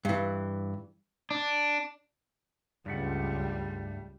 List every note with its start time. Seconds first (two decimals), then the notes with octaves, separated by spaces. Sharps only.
0.05 G2 E3
1.31 D4
2.86 C#2 G2 G3 A3 F#5